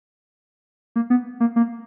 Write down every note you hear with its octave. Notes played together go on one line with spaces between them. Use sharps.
A#3
B3
A#3
A#3